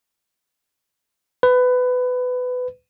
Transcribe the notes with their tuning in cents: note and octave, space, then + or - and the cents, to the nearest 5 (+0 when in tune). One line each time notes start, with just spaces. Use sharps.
B4 +20